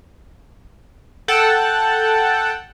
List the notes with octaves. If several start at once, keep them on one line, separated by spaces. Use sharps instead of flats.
A4 F#5 G5 A5